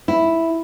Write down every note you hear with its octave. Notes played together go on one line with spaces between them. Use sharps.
E4